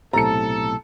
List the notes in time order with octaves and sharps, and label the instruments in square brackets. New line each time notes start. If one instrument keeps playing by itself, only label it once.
[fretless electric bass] B1 A2 C3 [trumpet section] A4 [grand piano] A#5 C#7